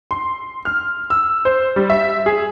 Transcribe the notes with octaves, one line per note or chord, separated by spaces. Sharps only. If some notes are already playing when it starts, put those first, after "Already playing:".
C6
F6
E6
C5
G3
E5
G#4